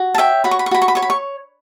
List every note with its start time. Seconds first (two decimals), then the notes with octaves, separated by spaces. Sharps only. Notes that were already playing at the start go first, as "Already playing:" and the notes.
Already playing: F#4
0.15 A5
0.18 C#5 E5 G5
0.44 F#4 B5
0.51 C#6
0.59 B5
0.66 C#6
0.71 F#4 B5
0.82 C#6
0.88 B5
0.95 C#5 C#6
1.02 B5
1.10 C#6